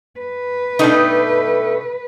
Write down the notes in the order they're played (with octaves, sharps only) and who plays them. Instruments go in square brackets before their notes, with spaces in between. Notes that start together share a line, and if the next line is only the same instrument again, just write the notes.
[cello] B4
[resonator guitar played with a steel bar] B2 D4 D#4 [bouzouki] A3 G5